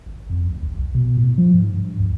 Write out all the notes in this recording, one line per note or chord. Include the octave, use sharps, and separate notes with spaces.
G#1
F2
D2
G1
B1
B2
A2
F3
G#2
G2
D2